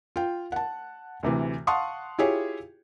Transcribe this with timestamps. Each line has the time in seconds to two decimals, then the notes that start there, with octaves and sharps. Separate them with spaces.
0.16 F4 G5
0.52 F#5 A5
1.23 D2 C3 E3
1.67 F5 F#5 A5 C6 C#6 D#6
2.19 E4 F4 G4 G#4 C#5